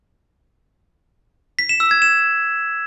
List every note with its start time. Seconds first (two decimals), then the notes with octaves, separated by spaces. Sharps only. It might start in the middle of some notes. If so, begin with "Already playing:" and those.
1.59 B6
1.69 E7
1.80 E6
1.91 G#6
2.02 E7